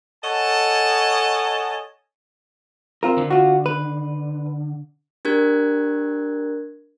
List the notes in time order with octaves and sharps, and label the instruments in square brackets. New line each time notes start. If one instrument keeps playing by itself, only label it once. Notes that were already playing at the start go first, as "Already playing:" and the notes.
[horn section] A4 C#5 D#5 F#5 G#5 A5
[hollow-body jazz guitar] C4 F4 A#4
[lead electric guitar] D3
[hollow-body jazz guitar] F4 F#4
B4
[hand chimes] D4 G4 A#4 F#6 G#6